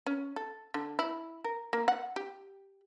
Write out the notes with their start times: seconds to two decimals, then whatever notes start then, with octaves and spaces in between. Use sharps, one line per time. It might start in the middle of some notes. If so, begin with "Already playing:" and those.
0.06 C#4
0.36 A4
0.74 D3
0.99 E4
1.44 A#4
1.73 A#3
1.88 F#5
2.16 G4